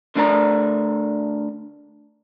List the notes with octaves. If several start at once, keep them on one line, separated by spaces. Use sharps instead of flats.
D3 A3 D4 A#4 D5 A#5